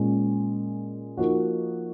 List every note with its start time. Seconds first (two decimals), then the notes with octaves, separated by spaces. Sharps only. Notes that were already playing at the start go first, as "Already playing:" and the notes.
Already playing: A#2 G#3 C#4
1.17 F3 A#3 D#4 F#4